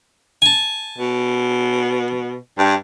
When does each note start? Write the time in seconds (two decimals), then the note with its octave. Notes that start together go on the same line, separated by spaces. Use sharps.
0.42 G#5 A5
0.98 B2
2.58 G2